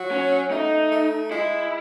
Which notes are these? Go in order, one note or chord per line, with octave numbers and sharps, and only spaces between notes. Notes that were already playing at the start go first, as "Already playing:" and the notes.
Already playing: F#3
C#4
A3 D#4
A3
G#3 E4